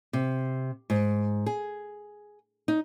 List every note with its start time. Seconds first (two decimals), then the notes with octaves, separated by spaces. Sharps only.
0.13 C3
0.90 G#2
1.46 G#4
2.68 D#4